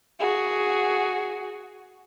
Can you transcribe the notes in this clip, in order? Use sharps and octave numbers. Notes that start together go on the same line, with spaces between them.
F#4 G#4